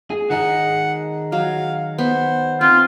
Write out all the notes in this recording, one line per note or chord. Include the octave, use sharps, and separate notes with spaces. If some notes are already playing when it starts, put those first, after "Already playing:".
G#4
D#3 D#4 G#4 F#5
F#3 F5
B3 C5
C4 F4